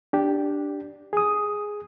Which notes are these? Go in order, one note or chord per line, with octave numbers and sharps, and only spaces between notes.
D4 G4
G#4 D#6